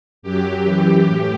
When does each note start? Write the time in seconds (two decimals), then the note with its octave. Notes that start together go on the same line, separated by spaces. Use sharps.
0.22 F#2 F#3 G4
0.64 F#2 E3 G4
1.05 A2